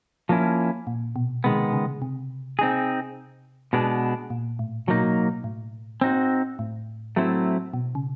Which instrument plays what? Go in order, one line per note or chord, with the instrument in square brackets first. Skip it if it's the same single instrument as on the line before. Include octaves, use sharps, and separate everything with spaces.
[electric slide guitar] F3 A#3 C#4 E4
[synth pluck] A#2
B2
[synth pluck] C3 [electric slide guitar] D#3 G#3 B3
[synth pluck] C#3
C3
[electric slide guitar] C4 D#4 G#4
B2 G#3 B3 D4
[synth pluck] A#2
A2
[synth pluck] B2 [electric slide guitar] F#3 A#3 D#4
[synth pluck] A2
[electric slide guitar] C4 D#4 F#4
[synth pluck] A2
[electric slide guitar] F#3 A3 C4 E4
[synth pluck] B2
C#3